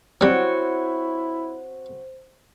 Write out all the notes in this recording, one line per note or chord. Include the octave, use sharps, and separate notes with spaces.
F#3 G3 C4 E4 F#4 C5 C#5